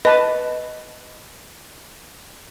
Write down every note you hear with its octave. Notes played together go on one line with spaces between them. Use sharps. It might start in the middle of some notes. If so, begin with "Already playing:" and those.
B4 D#5 A5